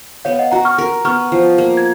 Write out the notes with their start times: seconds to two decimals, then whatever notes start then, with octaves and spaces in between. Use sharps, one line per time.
0.25 B3 C#5 F5
0.39 D#5 F#5
0.51 F#4 F#5 A#5
0.65 C#6 F6
0.78 A#4
1.05 B3 C#6 F6
1.32 F3
1.58 A#3
1.77 G#6